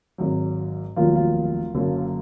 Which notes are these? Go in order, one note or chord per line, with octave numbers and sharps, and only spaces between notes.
G#1 G#2 F#3
F1 D#2 D#3 F#3 F4
F4
F#1 F#2 D3 F#3